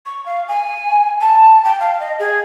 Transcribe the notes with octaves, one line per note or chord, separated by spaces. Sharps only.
C#6
F5
G#5
A5
G5
F5
D#5
G#4